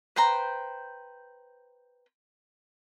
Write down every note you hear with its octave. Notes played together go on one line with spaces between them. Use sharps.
B4 C5 G5 A#5